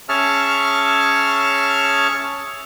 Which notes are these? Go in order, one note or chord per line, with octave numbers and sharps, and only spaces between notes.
C#4 G#4 E5 A5 C#6 F6